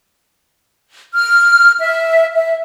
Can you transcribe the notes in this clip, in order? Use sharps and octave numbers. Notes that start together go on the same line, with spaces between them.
F6
E5
E5